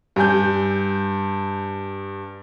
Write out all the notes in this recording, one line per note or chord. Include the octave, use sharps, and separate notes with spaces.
G2 G#5 G6